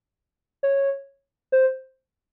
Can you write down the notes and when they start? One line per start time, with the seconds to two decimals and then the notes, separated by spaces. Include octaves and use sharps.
0.63 C#5
1.52 C5